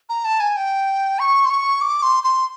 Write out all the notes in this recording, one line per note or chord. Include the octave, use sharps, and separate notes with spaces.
A#5
A5
G#5
G5
C#6
C6
C#6
D6
C6
C6